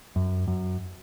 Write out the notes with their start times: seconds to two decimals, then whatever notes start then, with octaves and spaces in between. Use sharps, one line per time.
0.16 F#2
0.48 F#2